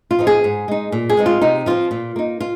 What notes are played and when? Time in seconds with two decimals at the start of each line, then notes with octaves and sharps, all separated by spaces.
0.11 F4
0.19 F3 C4 D#4
0.27 G#4
0.44 G#2
0.68 G#3 D#4
0.92 A#2
1.10 G#4
1.17 G#3 C4 D#4
1.26 F4
1.42 C3 D#4
1.66 F3 C4 F4
1.91 A#2
2.16 A#3 D#4
2.41 F4